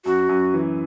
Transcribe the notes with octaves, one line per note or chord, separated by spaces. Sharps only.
F#2 F#4
F#2
E3